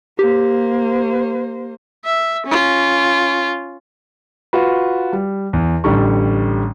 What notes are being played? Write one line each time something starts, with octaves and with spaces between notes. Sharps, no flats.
A#3 G4 C5
E5
C#4 F4
F4 F#4 B4
G3
E2
A1 D3 G3 C#6